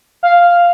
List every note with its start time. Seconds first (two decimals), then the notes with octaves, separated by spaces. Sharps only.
0.23 F5